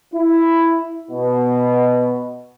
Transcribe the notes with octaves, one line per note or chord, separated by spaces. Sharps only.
E4
B2